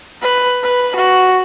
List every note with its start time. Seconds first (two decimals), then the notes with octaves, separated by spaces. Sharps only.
0.22 B4
0.63 B4
0.96 F#4